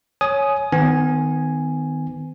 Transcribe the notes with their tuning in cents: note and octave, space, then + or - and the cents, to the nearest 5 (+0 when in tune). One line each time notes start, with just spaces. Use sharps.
C#5 +0 G#5 +20 D#6 +0
D#3 +0 B3 +40 G#5 +0